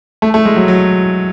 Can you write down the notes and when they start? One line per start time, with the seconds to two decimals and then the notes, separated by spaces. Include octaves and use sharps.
0.22 A3
0.34 A3
0.45 G#3
0.56 F#3
0.68 F#3